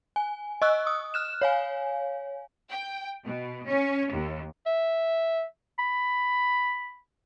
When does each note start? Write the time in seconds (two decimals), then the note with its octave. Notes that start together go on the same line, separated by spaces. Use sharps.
0.16 G#5
0.62 D#5 C#6 E6 F#6
0.87 D#6
1.14 F6 F#6 E7
1.42 C#5 F5 G#5
2.71 G5
3.25 B2
3.66 C#4
4.13 D#2
4.66 E5
5.79 B5